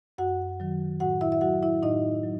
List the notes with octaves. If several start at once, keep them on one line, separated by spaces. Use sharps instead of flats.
F#2 F#4 F#5
D#3 F#3
A2 F#4 F#5
E4 E5
E5
F#3 F#4 F#5
E4 E5
A2 D#4 D#5
F#3